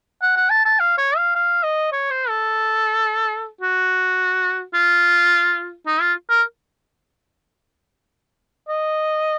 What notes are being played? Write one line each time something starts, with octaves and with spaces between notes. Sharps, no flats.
F#5
F#5
A5
A5
F5
C#5
F5
F5
D#5
C#5
C5
A4
F#4
F4
D#4
F4
A#4
D#5